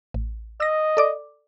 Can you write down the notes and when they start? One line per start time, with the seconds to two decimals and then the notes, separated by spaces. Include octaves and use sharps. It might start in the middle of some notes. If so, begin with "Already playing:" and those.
0.14 A1
0.60 D#5 E6 A#6
0.97 A4 D5 D6